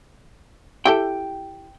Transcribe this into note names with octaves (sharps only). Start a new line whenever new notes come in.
E4 G4 A4 G5